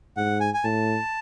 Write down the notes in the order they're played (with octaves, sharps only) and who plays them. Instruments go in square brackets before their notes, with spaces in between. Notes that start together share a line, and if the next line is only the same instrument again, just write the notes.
[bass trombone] G#2 [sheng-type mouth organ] F#5
[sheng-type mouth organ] G#5
G#5
[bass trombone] A2 [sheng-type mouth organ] A5